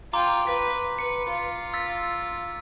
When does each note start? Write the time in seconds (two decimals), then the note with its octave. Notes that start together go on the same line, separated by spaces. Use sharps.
0.13 F4 G5 A#5 C6 D6
0.47 B4 B6
0.99 B4 C#7
1.29 F4
1.74 E6 A6 B6